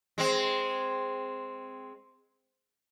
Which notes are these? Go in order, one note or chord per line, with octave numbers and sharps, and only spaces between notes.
G#3 C4